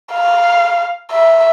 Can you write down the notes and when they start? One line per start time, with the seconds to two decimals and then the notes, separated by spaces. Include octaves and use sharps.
0.13 F5
1.11 E5